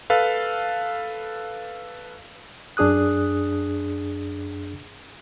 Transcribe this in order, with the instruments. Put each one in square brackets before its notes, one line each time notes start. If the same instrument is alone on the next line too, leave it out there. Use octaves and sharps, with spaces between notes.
[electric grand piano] A4 B4 F5
[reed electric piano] F#2 D4 G#4 D#6 F#6